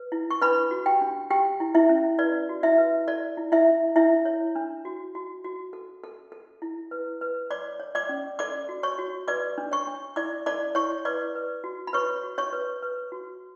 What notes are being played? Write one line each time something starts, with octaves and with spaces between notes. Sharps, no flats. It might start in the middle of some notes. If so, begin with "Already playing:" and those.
Already playing: B4
E4
C#6
D4 B4 B5
F#4
G4 G5
D4
G4 G5
E4
E4 E5
C#4
B4 D5
F#4
E4 E5
B4
A4 D5
E4
E4 E5
E4
D4 E4 E5
C#5
D4
F#4
F#4
F#4
A4
A4
A4
E4
B4
B4
C#5 D5 D6
C#5
D5 D6
C#4
A4 D5 D6
F#4
C#5 C#6
F#4
B4 D5 D6
D4
C#5 C#6
D4
E4 D5 D6
A4 D5 D6
E4 C#5 C#6
B4 D5 D6
B4
F#4
B5
B4 C#5 C#6
F#4
C#5 C#6
B4
B4
F#4